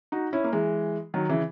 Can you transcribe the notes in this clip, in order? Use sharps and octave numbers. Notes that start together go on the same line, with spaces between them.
D#4 F#4
C#4 E4
A#3
E3 G#3
D#3 F#3
C#3 E3